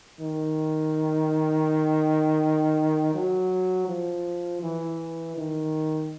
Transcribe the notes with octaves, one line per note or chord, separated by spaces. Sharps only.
D#3
F#3
F3
E3
D#3